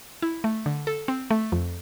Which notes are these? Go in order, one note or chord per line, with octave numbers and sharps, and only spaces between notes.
E4
A3
D3
A4
C4
A3
F2